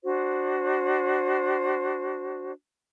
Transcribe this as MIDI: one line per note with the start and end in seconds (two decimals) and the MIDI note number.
0.04 2.52 62
0.04 2.52 66
0.04 2.52 72